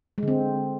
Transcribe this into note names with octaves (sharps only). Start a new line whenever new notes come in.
D3 G#3 C4